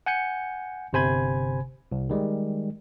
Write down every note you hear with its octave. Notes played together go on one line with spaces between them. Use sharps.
F#5 G#5 G6 C#7
G1 C3 C5 G#5 B5 G#6
C2
D#3 G3 G#3